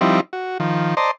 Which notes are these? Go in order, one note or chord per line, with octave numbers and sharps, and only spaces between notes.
F3 G3 C4 D#4 E4
F#4
D#3 F3
C5 D5 D#5 A5 A#5 C6